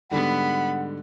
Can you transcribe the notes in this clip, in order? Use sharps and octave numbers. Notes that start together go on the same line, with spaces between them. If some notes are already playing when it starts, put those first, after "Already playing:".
G#2 D3 G3 B3 F#5 B5